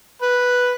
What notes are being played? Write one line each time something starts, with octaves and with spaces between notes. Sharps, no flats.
B4